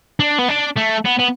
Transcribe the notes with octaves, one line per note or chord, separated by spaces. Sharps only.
D4
B3
D4
A3
B3
B3